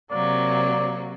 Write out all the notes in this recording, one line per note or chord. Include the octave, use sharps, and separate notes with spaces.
C3 F#3 A#3 D5